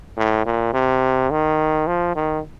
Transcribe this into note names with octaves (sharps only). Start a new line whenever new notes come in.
A2
A#2
C3
D#3
F3
D#3